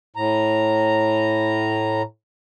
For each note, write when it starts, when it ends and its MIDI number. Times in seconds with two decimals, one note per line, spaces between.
0.16 2.02 45
0.16 2.02 82